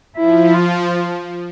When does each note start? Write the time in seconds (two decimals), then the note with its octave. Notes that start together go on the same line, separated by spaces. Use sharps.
0.16 F3 E4
0.54 F4